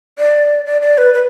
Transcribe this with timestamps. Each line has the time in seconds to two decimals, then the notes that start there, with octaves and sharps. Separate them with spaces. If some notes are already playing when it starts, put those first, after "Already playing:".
0.18 D5
0.66 D5
0.82 D5
0.98 B4
1.14 B4